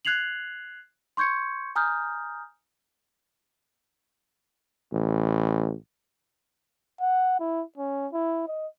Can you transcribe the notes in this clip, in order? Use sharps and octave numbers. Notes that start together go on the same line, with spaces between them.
F#6 G#6 C7 F7 F#7
C6 C#6 G6 G#6 C#7
G#5 A#5 D#6 F6 G6
A1
F#5
E4
C#4
E4
D#5